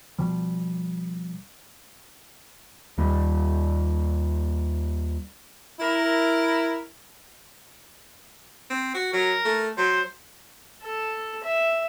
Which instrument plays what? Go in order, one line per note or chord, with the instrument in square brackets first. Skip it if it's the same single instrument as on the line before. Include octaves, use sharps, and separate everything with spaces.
[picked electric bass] B2 F3 G3
D#2 G3
[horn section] E4 A#4
[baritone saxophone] C4
F#4
[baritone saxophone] F#3 [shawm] A#4
[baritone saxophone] A3
[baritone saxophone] F#3 [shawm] C5
[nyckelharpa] A4
E5